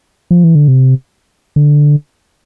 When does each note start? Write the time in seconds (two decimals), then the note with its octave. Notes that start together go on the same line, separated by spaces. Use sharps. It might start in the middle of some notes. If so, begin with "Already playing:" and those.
0.31 F3
0.44 E3
0.55 D3
0.68 C3
1.56 D3